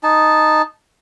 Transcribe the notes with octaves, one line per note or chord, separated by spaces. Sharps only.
D#4 A5